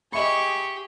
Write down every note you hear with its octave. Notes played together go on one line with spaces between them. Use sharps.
G4 G#4 D#5 E5 B5 C#6